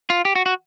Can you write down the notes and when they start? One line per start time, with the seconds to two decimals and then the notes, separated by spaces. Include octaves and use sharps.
0.10 F4
0.25 G4
0.35 F#4
0.46 F#4